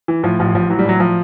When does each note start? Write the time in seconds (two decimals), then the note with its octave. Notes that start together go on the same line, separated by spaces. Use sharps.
0.08 E3
0.23 A2 F3
0.39 A1 F3
0.54 A1 F3
0.70 E3 F#3
0.79 G3
0.85 A2 F#3
1.00 F3